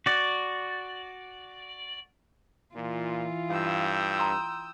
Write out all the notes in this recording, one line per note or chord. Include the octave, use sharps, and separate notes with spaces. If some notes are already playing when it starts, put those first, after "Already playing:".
F#4 D5
A#2 E3 F4
G2 F5 G5 D#6 E6
A#5 C6